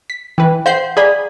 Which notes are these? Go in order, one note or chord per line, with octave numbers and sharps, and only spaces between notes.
B6
E3 B4 G5
C5 F5 F#5 C6 G6 C7
G#4 D5 A#5 B5 D6